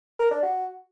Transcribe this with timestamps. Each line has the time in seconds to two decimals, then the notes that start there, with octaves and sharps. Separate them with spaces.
0.19 A#4
0.31 D4
0.43 F#4